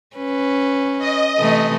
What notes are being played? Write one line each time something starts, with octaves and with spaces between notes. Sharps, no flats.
C#4 B4
D#5
C3 E3 A3